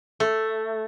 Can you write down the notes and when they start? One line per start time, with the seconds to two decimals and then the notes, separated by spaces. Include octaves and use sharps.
0.20 A3